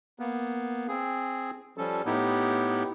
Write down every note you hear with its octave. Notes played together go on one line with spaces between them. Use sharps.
A#3 B3
C4 G#4
F3 G3 C#4 A4
A2 B3 D#4 E4 G4